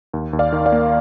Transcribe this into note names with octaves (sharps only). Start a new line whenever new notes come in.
D#2
D#2
D5 F5
D#3
D5 F5
A#3